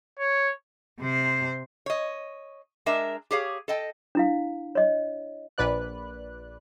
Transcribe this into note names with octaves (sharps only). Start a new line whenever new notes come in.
C#5
C3 C5
C#5 D#5
G#3 D4 A#4 E5
G4 G#4 C#5 F5
A4 D#5 G5
D4 E4 F5
C#5 D#5
A#1 B4 D5 F#6